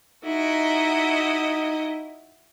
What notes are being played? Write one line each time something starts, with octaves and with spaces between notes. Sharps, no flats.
D#4 E4 F#4 D#5